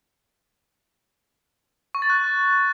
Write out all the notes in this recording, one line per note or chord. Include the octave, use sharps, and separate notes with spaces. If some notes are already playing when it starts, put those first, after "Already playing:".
C#6
A6
F#6